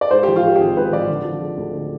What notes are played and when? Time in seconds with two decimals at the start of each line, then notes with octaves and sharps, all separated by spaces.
0.01 D5
0.11 G#2 C5
0.23 F3 G4
0.36 F4
0.44 G#3 G4
0.56 G4
0.59 G#1 G#4
0.76 G#2 B4
0.92 F3 D5
1.08 D3
1.24 F3
1.41 G#3
1.57 D2
1.74 D3